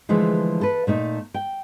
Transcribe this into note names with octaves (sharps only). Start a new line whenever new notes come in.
D3 E3 F3 G#3 A3
A4 B4
A#2 A3 D#4
G5